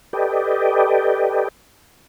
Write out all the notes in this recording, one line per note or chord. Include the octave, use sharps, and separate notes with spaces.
G4 A4 B4 D5 D#5 G5